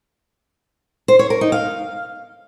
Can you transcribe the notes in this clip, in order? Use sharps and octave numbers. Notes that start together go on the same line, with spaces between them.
C5
C#5
A#4
D#4
F5